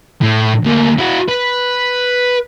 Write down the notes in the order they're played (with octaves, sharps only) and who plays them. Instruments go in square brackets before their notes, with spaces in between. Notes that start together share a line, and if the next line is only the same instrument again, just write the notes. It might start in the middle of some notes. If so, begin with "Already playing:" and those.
[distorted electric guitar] A2
D2 A#3
E4 F#4
B4